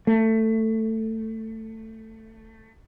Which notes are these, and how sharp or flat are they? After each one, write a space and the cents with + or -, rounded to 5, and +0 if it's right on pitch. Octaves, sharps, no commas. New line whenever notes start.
A3 +15